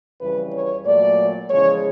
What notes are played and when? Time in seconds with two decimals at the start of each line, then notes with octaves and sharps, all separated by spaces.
0.20 F2 C#3 E3 G3 B4
0.52 C#5
0.85 A#2 F#3 A3 D5
1.49 E2 C#3 F3 G#3 C#5